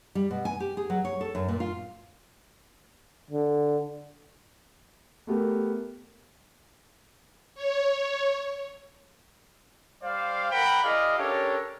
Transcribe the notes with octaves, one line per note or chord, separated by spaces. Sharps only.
G3
B2
G#5
G4
G#4
F#3
C#5
A4
F#2
A#2
F4
D3
A3 B3 G4 A#4
C#5
G3 C5 D5 F5
A#4 F#5 G5 B5
E4 G#4 D5 D#5 F5
C#4 D4 G4 A4 A#4 C#5